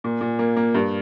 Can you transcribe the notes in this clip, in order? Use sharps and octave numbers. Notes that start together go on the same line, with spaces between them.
A#2
A#2
A#3
A#3
G2